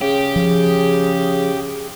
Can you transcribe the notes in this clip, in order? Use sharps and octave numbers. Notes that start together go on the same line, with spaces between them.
C#3 G4 G#4
F3